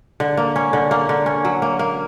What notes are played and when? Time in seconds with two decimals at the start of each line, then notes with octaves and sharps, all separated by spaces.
0.20 D3
0.37 A#3
0.56 C#4
0.73 D3
0.91 A#3
1.09 D3
1.26 C#4
1.45 F#3
1.62 A#3
1.79 A#3